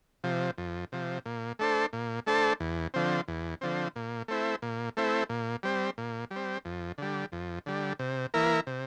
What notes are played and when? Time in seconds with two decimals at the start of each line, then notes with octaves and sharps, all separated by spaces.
0.24 C3 F3
0.58 F2
0.92 C3 F3
1.26 A#2
1.59 A3 D4 A4 C5
1.93 A#2
2.27 A3 D4 A4 C5
2.60 E2
2.94 D3 F3 C4
3.28 E2
3.61 D3 F3 C4
3.96 A#2
4.28 A3 C4 E4
4.62 A#2
4.97 A3 C4 E4
5.29 A#2
5.63 G3 C4
5.98 A#2
6.31 G3
6.36 C4
6.65 F2
6.98 D3 G3
7.32 F2
7.66 D3 G3
7.99 C3
8.34 E3 A#3 E4 A#4
8.67 C3